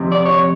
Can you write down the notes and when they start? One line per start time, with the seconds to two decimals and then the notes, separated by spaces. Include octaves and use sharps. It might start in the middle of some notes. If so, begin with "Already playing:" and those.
Already playing: F2 C3
0.12 D5
0.25 C#5